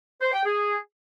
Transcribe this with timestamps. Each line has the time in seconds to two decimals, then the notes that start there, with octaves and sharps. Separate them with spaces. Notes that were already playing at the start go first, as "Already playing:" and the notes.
0.21 C5
0.33 G5
0.45 G#4